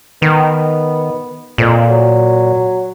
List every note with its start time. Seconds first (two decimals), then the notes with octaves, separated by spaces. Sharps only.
0.22 D#3 B3
1.58 F2 A#2
1.90 F#3